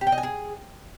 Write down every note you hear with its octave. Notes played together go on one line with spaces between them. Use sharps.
G4
G5
D#5
G#5
G#4